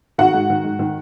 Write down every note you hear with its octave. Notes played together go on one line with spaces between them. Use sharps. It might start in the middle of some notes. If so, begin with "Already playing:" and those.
D#3 F#4 F#5
G#2
D#3
G#2
D#3